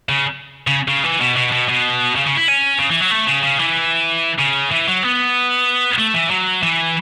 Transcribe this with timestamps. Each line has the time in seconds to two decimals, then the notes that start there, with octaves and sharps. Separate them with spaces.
0.09 C#3
0.67 C#3
0.88 C#3
1.04 E3
1.20 B2
1.36 B2
1.52 B2
1.68 B2
2.16 C#3
2.26 C#3
2.37 E4
2.48 C#4
2.79 C#3
2.90 E3
3.01 F#3
3.12 A3
3.28 C#3
3.43 C#3
3.59 E3
4.39 C#3
4.72 E3
4.87 F#3
5.03 B3
5.99 A3
6.14 E3
6.31 F#3
6.63 E3